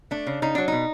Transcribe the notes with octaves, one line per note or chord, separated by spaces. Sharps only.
A3 D4
C#3
C#3 D#4
F#3 D4
B2 D#4